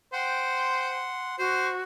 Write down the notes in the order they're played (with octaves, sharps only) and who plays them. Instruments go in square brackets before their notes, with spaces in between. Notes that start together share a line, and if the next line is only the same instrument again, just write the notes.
[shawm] C5 [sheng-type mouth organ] F#5 C6 [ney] G5
[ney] F#4 [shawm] C5